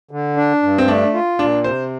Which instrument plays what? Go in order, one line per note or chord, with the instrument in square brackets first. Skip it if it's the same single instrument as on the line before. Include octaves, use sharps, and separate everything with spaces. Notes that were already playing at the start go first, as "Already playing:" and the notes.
[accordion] D3
D4
G2
[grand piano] C4
[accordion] A3 [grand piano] D4
[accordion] F4
[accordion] A#2 [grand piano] D4
[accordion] C3 [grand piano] C5